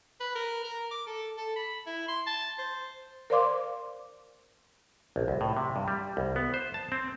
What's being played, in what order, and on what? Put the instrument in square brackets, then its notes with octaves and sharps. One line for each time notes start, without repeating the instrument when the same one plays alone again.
[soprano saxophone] B4
A#4
A#4
D6
A4
A4
B5
E4
C6
A5
C5
[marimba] A#4 C5 D5 F5 C6 D6
[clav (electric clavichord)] A#1
C2
A2
C3
G2
G3
C2
B3
C5
A5
C4